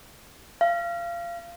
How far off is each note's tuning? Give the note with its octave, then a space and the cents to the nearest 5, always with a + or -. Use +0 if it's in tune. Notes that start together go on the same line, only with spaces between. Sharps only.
F5 -25